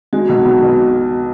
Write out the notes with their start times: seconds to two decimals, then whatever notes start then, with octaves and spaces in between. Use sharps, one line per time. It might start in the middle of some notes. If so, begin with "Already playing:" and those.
0.13 G#3 F#4
0.29 B1
0.45 B1
0.62 B2